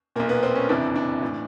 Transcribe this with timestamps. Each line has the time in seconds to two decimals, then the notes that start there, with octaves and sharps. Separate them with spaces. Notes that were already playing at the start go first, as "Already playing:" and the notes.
0.16 B1 A#2 A#3
0.29 B3
0.43 C4
0.56 C#4
0.69 F#1 F2 C3 E3 D4
0.96 D4
1.22 A2 E3